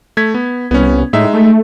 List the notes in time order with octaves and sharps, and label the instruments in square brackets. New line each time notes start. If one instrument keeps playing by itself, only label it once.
[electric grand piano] A3 G#6 B6
B3
[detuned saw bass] C2 [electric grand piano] B3 C#4
[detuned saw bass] A2 [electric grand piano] G#3 D#4 E5
[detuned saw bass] A3